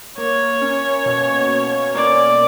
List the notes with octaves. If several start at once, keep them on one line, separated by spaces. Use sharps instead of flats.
A#3 C#5
C#4
B2
B2
A#3 D5